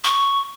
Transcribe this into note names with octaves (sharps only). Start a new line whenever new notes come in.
C#6